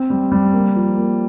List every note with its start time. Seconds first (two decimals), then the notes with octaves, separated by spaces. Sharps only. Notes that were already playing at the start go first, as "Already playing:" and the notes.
Already playing: C4
0.10 G3
0.32 G3
0.53 A#3
0.76 F3
0.97 A#3